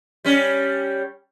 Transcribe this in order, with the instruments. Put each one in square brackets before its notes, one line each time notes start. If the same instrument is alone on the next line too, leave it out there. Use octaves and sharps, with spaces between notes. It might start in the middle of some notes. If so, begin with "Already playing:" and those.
[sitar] G3 C#4